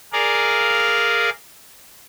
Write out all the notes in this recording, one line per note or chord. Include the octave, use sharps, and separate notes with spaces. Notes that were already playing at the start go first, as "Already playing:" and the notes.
G#4 A#4 D5 F5